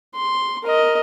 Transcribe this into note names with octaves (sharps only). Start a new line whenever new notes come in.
C6
A#4 D#5